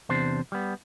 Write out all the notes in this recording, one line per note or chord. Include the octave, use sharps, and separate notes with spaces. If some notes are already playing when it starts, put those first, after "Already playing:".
E2 C3 D4 C5
G3 B3